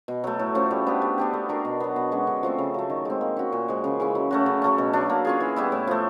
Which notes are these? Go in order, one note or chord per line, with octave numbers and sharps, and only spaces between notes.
B2
F#3 A3
A2
F3 A3 C#4
G3
B3 D4 G4
G3
B3 D4 G4
A3
D4 F#4 A#4
B2
F#3 B3
B2
G#3 C#4 F#4
D3
F3 A3 C4
C#3
F#3 A3
D#3
G#3 C4
A#3
C#4 F#4
A#2
F3 G#3
C#3
E3 G#3 C#4
F#3
A3 C#4 F#4
C#3
F#3 A3 C#4
B2
F#3 A3 D4
A#3
C#4 F4 G#4
E3
G3 B3 E4
A2
F3 A3